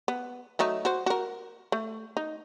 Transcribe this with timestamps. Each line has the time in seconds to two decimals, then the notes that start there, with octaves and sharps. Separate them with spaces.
0.08 B3
0.59 F#3 A3 D#4
0.85 F#4 C5
1.06 F#4 A#4
1.72 A3
2.17 D#4